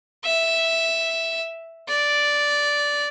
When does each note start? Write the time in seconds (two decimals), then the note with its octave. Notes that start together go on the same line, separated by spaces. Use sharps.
0.25 E5
1.89 D5